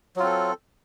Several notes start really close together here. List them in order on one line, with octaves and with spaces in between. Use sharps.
F#3 F4 C4 A4